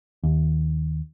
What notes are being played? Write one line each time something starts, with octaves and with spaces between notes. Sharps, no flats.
D#2